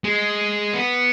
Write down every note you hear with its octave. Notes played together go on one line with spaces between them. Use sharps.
G#3
B3